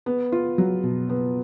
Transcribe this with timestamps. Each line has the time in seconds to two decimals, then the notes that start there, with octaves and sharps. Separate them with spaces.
0.06 B3
0.32 F4
0.58 F#3
0.83 B2
1.09 B3